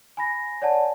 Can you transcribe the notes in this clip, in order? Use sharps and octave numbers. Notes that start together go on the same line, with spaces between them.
G#5 B5 A#6
C#5 D5 F#5 G#5 A5